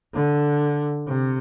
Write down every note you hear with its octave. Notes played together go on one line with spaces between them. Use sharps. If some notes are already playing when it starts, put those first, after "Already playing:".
D3
C3